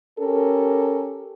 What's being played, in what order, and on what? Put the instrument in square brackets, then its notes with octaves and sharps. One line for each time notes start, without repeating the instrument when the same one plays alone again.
[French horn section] C#4 G4 A4 A#4